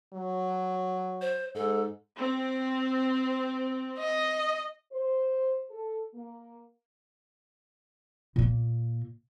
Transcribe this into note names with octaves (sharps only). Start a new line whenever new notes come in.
F#3
C5
G#2 A4
C4
D#5
C5
A4
A#3
A#2 A#3